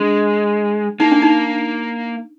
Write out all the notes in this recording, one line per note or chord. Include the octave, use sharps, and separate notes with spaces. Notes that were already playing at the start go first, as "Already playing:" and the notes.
Already playing: G#3 D4
A#3 D#4
D4
D#4